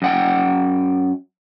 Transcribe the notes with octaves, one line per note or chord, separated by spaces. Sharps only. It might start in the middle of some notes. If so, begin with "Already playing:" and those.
F#2 F#5 G5